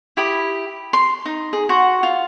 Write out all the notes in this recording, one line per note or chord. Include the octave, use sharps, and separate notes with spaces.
E4 G4 B5 D#6
C6
D#4
G#4
F#4 F#5 C6
F4